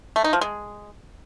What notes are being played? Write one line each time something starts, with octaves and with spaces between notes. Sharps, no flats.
A3
D#4
F3
G#3